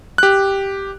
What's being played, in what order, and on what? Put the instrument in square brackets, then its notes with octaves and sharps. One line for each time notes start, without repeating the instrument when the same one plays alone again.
[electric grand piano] G4 F#6